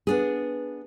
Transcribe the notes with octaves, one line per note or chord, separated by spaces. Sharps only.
B3 D4 G#4